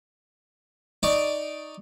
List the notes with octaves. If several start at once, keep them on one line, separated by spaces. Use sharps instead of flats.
D#4 D5 C#6